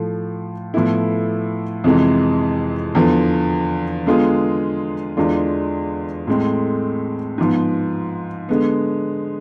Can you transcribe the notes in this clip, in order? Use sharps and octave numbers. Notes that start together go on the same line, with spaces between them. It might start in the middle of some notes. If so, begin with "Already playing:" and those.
Already playing: A2 F3 A3
A2 F3 B3 E4
F2 C3 E3 G#3
E2 D3 F3 B3
D3 G#3 B3 F4 G#4
E2 D3 G#3 D4 F4
A2 G#3 C4
G#2 F3 B3
D3 G#3 B3